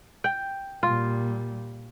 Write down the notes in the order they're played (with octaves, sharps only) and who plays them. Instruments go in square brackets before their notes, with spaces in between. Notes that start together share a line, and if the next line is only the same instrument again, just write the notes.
[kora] G5
[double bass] A#2 G3 [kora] F4